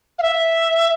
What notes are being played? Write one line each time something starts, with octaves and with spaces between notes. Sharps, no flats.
F5
E5